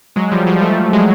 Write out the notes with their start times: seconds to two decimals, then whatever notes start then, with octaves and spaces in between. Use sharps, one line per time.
0.16 F#3 G#3
0.32 F3 G3
0.47 F3 G3
0.61 G3 A3
0.93 F#3 G#3